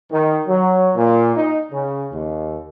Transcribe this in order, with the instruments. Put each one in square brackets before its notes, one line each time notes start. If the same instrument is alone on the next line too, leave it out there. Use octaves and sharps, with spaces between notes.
[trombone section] D#3
F#3
A#2
D#4
C#3
D#2